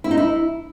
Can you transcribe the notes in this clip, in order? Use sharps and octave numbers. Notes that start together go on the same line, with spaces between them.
E4
D#4
E4